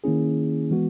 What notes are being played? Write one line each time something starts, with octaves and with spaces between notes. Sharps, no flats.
D#3 A#3 C#4 E4 G#4
E3 G#3 B3 F#4